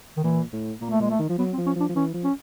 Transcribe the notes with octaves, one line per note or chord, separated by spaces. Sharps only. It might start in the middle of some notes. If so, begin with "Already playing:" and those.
D#3
A#2 E3
A2
A#2 A#3
A3
A#2 G#3
A3
D#3
F3
F#3 B3
C4
F3
C#4
F3
D4
F3
E3 C#4
F3
C#4